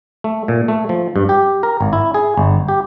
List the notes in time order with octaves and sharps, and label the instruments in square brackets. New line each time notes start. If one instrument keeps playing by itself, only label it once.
[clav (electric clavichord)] A3
A#2
A3
F3
G2
G4
A#4
G#1
E4
G#4
G1
G4